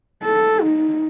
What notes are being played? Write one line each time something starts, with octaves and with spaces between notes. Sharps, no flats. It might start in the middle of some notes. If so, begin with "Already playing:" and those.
A4
D#4